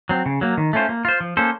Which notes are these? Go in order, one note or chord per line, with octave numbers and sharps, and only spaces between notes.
F#3 C4
C#3
F#3 A#3
D#3
A3 C#4 F4 C5
A#3
F4 C5
F3
A#3 C#4 A4 C5